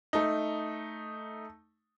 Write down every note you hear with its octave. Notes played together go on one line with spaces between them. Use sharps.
A3 D#4